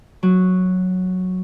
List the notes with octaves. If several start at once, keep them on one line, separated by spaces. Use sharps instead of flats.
F#3